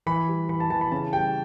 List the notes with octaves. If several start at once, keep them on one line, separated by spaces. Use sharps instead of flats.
E3 B5
G3
E3 B5
A5
E3 A5
B5
C#3 A5
G3 G5